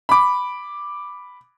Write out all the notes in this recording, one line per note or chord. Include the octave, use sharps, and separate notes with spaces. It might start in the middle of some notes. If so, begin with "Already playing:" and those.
B5 D6